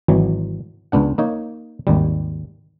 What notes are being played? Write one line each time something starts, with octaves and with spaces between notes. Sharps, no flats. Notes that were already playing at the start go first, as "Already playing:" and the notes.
G#1 E3 F#3
C#2 B3 D4 F#5
A#3 D#4 C#5
G#1 D#2 G3